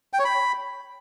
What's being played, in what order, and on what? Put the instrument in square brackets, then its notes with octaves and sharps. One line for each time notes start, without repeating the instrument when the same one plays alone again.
[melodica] G5
C#5
B5